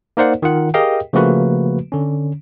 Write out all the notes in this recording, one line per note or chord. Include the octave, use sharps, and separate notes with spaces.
A#3 D#4 A#4 C5 D5 F#5
D#3 F4 F#5
G4 G#4 A#4 D#5 F5 G5
C#3 F3 A3 A#3 F#4 B4
D3 C#4